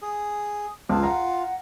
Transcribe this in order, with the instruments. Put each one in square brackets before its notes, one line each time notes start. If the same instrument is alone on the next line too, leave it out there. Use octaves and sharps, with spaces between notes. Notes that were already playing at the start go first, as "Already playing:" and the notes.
[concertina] G#4
[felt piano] C#2 [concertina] F4 [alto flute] A5
[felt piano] F5 A#5 [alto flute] F#5